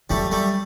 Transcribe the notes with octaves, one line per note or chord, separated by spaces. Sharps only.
F#3 G3 A3
G3 A3